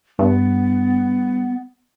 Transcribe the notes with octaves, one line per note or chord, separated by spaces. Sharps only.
G2 B3